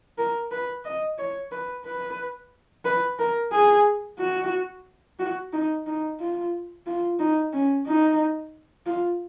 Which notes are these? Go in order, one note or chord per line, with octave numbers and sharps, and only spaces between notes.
A#4
B4
D#5
C#5
B4
B4
B4
A#4
G#4
F#4
F#4
D#4
D#4
F4
F4
D#4
C#4
D#4
F4